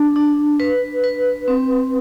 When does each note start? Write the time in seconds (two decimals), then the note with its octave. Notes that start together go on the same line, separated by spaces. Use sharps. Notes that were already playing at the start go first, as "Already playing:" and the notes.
Already playing: D4
0.16 D4
0.60 B4
1.04 B4
1.48 C4